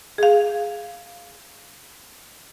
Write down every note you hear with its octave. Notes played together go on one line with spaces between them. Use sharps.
G#4 F5